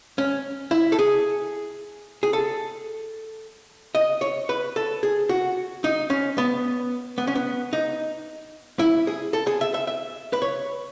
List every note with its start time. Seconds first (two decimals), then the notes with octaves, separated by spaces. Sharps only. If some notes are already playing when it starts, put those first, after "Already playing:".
0.18 C#4
0.71 E4
0.92 A4
0.99 G#4
2.23 G#4
2.33 A4
3.95 D#5
4.21 C#5
4.49 B4
4.76 A4
5.03 G#4
5.29 F#4
5.84 D#4
6.10 C#4
6.38 B3
7.18 B3
7.27 C#4
7.35 B3
7.73 D#4
8.79 E4
9.07 G#4
9.33 A4
9.47 G#4
9.61 E5
9.74 E5
9.87 E5
10.33 B4
10.42 C#5